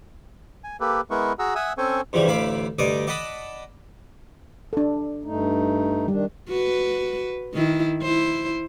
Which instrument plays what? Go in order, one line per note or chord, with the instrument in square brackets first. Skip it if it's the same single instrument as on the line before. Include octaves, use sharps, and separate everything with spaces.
[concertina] G#5
A#3 G4 A4 B4
G#3 B3 E4 A#4 B4 C#6
F#4 G#4 F#5 A#5 E6
E5 F#5 G#5 D#6 E6
C4 C#4 A4 C5 G#5 C#6
[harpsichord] G2 C#3 E3 F3 G3
A1 D2 E4 F5 B5 D6
D2 G2 D5 D#5 D6 D#6
D5 D#5 F#5 A5 B5 D#6
[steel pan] D4 A4
[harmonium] G2 A3 D#4
[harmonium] D#3 D4 [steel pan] G3
[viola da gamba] F#4 B4
D#3 E4
E4 C5